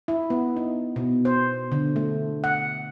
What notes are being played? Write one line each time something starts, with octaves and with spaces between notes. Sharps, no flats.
E4
B3
D#4
B2
C5
D3
A3
F#5